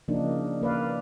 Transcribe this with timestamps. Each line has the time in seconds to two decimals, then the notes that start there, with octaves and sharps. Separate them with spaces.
0.08 C#3 F3 A#3 D4 D#4
0.62 A#3 B4 D5 F5